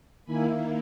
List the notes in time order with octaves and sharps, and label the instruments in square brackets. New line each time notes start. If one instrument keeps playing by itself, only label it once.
[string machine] D#3 A#3 E4 G#5 B5